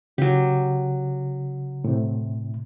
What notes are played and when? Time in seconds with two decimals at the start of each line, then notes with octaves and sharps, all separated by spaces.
0.18 C#3 F#3 G4
1.84 A2 C3